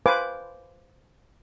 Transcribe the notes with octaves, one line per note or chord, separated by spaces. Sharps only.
B4 C5 F5 G#5 D6